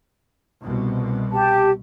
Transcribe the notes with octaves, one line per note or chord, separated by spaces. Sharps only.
C2 B2
G4 A5